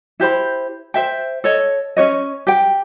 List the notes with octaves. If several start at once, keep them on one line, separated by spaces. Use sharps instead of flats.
E4 G4 C5 B5
C5 E5 G5
A4 C#5 D#5
C#4 F#4 C#5 D#5
G4 G5